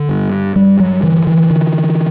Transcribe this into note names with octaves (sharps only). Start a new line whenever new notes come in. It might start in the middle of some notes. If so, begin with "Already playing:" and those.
Already playing: D3
G2
G2 G3
F#3
D3 E3
E3
D3